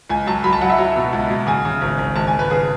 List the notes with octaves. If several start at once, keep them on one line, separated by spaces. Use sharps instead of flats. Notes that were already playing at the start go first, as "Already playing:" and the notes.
C#2 G#5
F#3 A5
F#3 B5
A5
F#3 F#5
E5
F#3
B2
C#2
B2
C#3 G#5
C#3
G#1
G#1
G#1 A5
G#5
G#1
B4
C#3 G#4